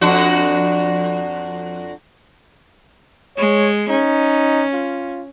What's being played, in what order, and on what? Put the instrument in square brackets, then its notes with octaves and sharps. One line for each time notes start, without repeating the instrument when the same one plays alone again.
[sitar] F2 D4 F#4
[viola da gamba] G#3 [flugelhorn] C#5
[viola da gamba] C#4 [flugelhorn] D#4
[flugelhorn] F4